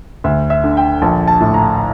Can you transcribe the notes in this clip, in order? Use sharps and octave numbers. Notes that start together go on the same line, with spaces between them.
D2 E5
E5
D3
G5
A#1 A5
A5
A2
A#5